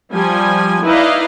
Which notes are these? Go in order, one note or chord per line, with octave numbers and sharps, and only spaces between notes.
F3 G3 G#5
D#4 E4 B4 D5 D#5 F5